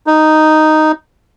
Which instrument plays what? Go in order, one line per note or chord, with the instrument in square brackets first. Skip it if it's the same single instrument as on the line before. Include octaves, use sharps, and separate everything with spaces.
[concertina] D#4